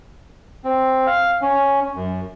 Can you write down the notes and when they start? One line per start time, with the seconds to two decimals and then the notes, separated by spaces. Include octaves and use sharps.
0.65 C4
1.07 F5
1.42 C#4
1.96 F#2